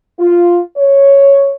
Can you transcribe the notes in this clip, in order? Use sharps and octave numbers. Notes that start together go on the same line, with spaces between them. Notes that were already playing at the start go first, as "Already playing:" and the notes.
F4
C#5